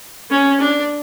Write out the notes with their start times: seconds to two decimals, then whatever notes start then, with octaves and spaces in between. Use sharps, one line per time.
0.30 C#4
0.60 D4